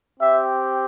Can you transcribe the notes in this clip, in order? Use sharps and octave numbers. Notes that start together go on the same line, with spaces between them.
C4 G4 E5